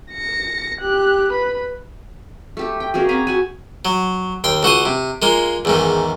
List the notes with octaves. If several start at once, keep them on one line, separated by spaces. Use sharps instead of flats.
A#6 C#7
G4 F#6
B4 B5
A3 G4 A4
G5
A#3 C#4 F#4 G#4
C4 G#5 A#5 B5
F#4 F#5 G#5
F#3
D#2 G5 C6
C#2 F#4 C5 D#6
C3
G#3 A#3 F4
E2 G#2 D#3